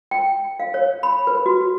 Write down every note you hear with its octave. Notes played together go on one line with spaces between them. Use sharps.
G5
F5
C#5
B5
B4
F#4